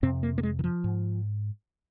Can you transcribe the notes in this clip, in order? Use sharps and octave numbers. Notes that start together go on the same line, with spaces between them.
F2 C3 C4
A#3
A#3
G#3
D#3
F3
G#2